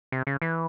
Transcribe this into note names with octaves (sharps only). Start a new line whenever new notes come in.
C3
C#3
E3